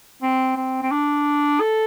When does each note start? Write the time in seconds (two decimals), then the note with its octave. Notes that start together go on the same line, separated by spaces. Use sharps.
0.22 C4
0.56 C4
0.82 C4
0.91 D4
1.60 A4